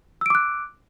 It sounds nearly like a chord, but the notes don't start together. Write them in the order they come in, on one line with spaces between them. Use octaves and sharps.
E6 D7 D6 F#6